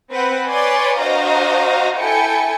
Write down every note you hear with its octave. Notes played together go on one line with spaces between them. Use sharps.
C4 B4 F#5
B4 C#5 D5 G#5 C6
D4 F#4 C5 D#5 F5 A#5
E4 A4 G5 G#5 C#7